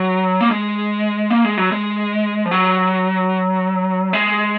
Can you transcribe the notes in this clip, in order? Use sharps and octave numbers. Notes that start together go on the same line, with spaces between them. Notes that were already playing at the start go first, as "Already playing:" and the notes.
Already playing: F#3
A#3
G#3
A#3
G#3
F#3
G#3
F3
F#3
G#3